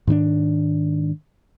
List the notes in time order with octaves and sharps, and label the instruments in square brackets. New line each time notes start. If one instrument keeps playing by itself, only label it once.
[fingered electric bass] G#2 D#3 C#4 D4